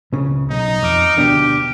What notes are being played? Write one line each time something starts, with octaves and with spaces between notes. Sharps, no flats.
C#2 C#3
B1 D#4
F2 D6 F6 D7
D2 B2 D4 G4